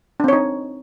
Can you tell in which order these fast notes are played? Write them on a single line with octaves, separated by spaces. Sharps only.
D4 C4 C#5 D#4